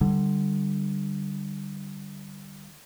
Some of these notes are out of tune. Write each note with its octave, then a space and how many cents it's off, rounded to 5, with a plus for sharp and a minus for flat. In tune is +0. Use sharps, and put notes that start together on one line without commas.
D3 +20 G3 +0